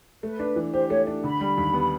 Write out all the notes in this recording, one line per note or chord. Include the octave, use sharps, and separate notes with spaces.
A3 B4
D4
E3
G4 C5
A3 C#5
D4
D3 B5
G3
D#2
B3